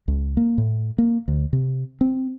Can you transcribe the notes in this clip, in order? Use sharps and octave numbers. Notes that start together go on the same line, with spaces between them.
C#2
A#3
A2
A#3
D2
C3
C4